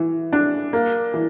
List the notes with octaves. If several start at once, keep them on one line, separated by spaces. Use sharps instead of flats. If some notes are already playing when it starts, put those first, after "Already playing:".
Already playing: E3
D4
A#3
E3